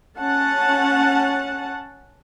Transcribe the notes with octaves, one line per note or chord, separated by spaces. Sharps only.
C#4 F#5 A5